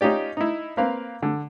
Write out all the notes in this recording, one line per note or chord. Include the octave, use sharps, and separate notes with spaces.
C#4 D#4 F4 G4 D5
D#4 E4
A#3 C4 B4 F5
D3